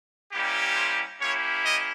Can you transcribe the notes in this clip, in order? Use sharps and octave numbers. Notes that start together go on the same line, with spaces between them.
G3 A#3 C#4 E4 G4
C5
A#3 C#4 E4 G4 C#5
D#5